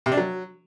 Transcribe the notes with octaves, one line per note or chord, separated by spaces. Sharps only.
C3
D4
F#3